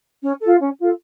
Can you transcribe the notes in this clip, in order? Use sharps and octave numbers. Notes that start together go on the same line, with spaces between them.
C#4
F4 A4
C#4
F4 A4